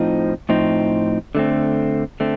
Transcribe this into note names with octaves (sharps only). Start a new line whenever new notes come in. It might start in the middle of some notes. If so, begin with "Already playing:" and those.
Already playing: A2 F3 C4 D#4
A2 F3 C4 D#4
D3 A3 C4
D3 A3 C4